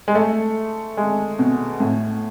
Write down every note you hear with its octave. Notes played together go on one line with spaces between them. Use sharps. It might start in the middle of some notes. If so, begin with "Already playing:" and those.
G#3
A3
G#3
B2
A2